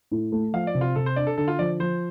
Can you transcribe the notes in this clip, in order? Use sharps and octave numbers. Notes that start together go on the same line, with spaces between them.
A2
A3
F3 F5
D5
C3
F4
C3 A4
C5
D4 D5
A4
D3 A4
F4
F3 D5
F3 C5